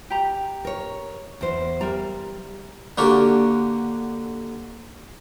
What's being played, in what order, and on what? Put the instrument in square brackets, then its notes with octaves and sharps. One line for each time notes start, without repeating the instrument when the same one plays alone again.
[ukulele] G4 A#5
[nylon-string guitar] A#4 C#5
E2 C5
[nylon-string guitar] G3 [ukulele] A#4 A#5
[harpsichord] D3 A#3 F#4 G4